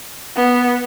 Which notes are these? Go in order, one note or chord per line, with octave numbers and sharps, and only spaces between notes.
B3